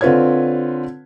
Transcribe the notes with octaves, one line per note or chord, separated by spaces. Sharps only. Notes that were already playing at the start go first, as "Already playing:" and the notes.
D3 C4 F4 B4 C#5 G#6